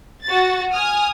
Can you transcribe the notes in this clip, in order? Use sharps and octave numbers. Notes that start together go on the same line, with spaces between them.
F#4 A6
G#5 D#6 F6